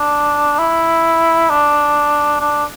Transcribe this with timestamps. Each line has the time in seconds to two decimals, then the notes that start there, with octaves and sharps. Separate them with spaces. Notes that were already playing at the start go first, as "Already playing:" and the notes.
Already playing: D4
0.59 E4
1.50 D4
2.41 D4